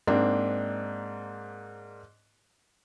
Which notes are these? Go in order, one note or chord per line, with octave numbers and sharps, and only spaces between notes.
G#2 A#3 C4 D4